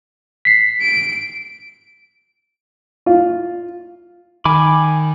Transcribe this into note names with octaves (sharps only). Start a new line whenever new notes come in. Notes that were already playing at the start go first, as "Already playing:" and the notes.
B6 C7
D7
F4
D#3 G#5 B5 D6